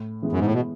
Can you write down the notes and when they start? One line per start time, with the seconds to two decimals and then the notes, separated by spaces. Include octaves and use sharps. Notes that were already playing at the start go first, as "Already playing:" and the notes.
Already playing: A2
0.22 E3 G#3 B3 E4
0.32 F#2
0.39 G#2
0.46 A2
0.54 B2